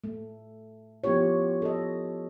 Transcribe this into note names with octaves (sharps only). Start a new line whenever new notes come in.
A3
F3 B3 E4 F4 G4 C#5
A4 D#5